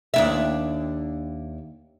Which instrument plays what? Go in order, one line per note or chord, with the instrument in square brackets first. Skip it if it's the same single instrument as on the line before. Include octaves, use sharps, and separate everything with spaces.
[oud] D#2 D4 E5